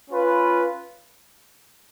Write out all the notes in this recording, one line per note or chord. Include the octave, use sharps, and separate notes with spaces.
C#4 F4 B4